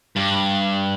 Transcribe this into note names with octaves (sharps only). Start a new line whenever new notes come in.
G2